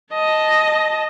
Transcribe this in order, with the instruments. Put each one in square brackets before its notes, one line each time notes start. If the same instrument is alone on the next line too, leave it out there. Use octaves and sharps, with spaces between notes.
[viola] D#5 A5